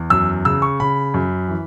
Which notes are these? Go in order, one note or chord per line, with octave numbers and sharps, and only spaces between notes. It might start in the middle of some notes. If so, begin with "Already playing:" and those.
Already playing: E2
F#2 E6
C#3 E6
C#6
C#3 B5
F#2
E3